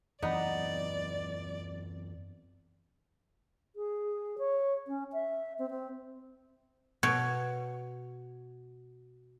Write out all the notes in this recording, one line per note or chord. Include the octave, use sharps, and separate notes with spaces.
F#2 E3 B3 C4 D#4 D5
G#4
C#5
C#4
E5
C4
C4
B2 C#5